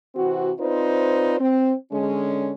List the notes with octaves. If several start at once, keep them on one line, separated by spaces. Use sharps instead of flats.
C3 E3 C4 F#4
C4 D#4 F4 B4 C5 D5
C4
D3 G#3 C#4